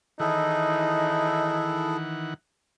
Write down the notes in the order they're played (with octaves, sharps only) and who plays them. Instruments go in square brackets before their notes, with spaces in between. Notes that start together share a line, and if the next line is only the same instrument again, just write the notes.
[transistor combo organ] D#3 E3 F#5 [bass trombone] D#4 [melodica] E4 G#4 A4